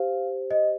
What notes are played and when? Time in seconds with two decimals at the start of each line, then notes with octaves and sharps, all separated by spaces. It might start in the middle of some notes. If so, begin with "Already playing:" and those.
Already playing: G4 C5 F5
0.51 D#5